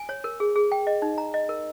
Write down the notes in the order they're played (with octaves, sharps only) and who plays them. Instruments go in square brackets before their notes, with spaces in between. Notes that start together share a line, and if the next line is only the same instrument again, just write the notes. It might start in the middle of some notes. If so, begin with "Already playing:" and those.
Already playing: [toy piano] G#5
C#5
A#4
G#4
G#4
G5
D#5
D#4
A#5
D#5
A#4